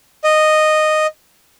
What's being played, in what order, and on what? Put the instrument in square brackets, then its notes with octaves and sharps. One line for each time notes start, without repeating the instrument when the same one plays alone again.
[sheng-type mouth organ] D#5